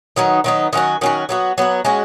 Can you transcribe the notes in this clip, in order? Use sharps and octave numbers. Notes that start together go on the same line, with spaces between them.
D#3 F#3 B3 D#4
D#3 F#3 B3 D#4
D#3 F#3 C#4 F#4
D#3 F#3 C#4 F#4
F#3 B3 F#4
F#3 B3 F#4
G#3 C#4 F#4